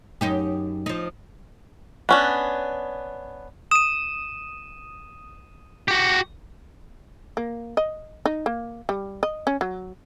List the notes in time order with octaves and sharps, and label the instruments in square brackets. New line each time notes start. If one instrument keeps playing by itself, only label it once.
[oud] F#2 D#4 G4
F3 D#4
[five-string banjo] B3 C#4 D4
[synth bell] D#6 [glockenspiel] D#7 E7
[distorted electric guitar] F#4 G4
[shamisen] A#3
D#5
D#4
A#3
G3
D#5
C#4
F#3